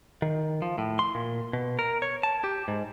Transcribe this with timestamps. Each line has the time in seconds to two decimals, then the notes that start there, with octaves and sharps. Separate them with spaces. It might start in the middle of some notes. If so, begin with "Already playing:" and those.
0.22 D#3
0.62 F3
0.78 A2
0.99 C6
1.15 A#2
1.53 B2
1.79 A#4
2.02 C#5
2.23 A5
2.44 G4
2.68 G#2